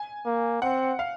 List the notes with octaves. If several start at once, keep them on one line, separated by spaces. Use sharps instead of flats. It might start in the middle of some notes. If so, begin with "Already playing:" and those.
Already playing: G#5
A#3
C4 F#5
F5